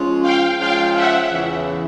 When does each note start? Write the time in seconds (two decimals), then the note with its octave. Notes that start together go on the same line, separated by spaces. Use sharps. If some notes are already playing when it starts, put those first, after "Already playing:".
Already playing: F3 G#3 C#4 F4
0.22 F5 G5
0.58 F3 G#3 C#4 F4 F5 G5
0.95 E5 F#5
1.31 E2 C#3 E3